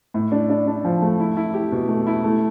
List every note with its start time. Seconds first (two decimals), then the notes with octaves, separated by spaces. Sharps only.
0.14 A2
0.32 D4
0.49 D4
0.67 D4
0.85 F3
1.02 A3
1.20 E4
1.37 E4
1.54 G4
1.72 B2
1.89 A3
2.07 E4
2.24 A3